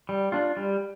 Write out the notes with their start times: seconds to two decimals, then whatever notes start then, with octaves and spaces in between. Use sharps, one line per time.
0.09 G3
0.32 D4 F4
0.57 G3